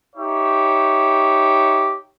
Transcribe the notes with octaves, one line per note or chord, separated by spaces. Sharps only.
D#4 G4 C#5 E5